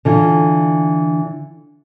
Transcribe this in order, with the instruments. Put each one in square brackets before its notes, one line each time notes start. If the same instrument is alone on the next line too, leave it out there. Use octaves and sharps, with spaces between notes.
[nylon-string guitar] D3 E3 F4